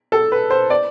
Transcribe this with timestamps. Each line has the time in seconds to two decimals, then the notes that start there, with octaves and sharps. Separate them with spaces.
0.12 A4
0.32 B4
0.50 C5
0.70 D5